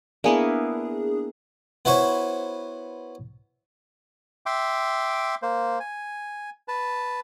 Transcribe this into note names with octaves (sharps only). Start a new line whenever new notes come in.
A#3 B3 D4 E4 G#4
B3 E4 F#4 C5 C#5
E5 G5 C6 D6
A#3 C5
G#5
B4 A5